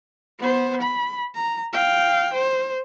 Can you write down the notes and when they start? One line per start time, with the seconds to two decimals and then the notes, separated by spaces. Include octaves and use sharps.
0.40 B3 C5
0.82 B5
1.35 A#5
1.73 F5 G5
2.34 C5